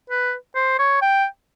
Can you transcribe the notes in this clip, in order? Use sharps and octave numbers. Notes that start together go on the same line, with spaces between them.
B4
C5
C#5
G5